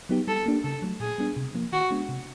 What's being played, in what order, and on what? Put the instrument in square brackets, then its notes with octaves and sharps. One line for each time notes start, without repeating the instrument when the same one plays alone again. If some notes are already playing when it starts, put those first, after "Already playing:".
[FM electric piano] F#3 B3 D#4 G4
[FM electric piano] G3 [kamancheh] A4
[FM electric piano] A#3 D4 G4
[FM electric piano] C#3 [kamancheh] A4
[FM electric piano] F#3 A3
[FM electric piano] A#2 [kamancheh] G#4
[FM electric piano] G3 B3 D4
C3
F3 A#3
[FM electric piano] D#3 [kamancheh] F#4
[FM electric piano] G#3 B3 D4 F#4
C3